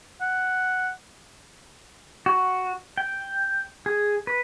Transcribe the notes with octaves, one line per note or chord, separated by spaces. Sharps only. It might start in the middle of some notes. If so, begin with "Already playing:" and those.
F#5
F#4
G5
G#4
B4